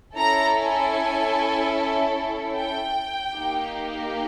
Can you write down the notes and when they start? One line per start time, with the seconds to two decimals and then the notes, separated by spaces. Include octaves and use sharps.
0.16 C#4 E4 A4 A#5
0.57 G#5
2.55 G5
3.34 A#3 D#4 G4